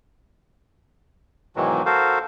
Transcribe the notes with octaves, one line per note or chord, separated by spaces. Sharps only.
G#2 B2 D#3 E3 F#3
F#4 A4 A#4 C5 F5